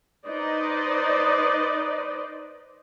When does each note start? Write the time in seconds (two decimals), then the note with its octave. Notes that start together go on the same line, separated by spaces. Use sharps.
0.27 D#4 B4 C5 D5 D#5